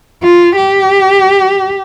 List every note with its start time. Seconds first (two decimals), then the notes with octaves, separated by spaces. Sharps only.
0.24 F4
0.56 G4